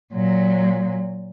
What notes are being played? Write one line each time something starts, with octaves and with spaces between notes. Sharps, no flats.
A#2 F#3